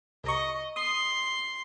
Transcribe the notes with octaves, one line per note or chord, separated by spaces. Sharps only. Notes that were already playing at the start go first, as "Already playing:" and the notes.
C2 D#5 A#5 C#6
C6 D#6